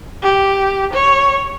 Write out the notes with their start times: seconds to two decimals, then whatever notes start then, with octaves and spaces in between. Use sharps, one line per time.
0.23 G4
0.93 C#5